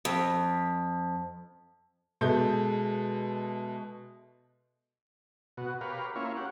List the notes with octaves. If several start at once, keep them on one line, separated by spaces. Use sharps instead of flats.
F2
B2 G#3 A4 E5 G6
B2 F#4
G4 A#4 B4 C#5 F5
A#3 C#4 E4 F4 C#5
G4 F#5